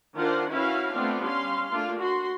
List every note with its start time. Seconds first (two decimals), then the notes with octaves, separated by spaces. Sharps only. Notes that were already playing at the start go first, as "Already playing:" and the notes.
0.16 D#3 D4 F4 A#4 C5 F#5
0.50 C#4 E4 F#4 B4 F5
0.92 A3 B3 C4 D4 F4
1.23 G3 C#4 F5 C6
1.72 A3 A#3 D4 F4
2.01 F#4 C6